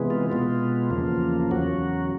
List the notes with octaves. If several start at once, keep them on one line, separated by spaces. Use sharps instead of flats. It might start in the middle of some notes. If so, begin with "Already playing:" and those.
Already playing: C3 E3 G#3 B3
F4
B2 G#3 B3
E2 C#3 F3 A#3
E2 C#3 F#3 F#4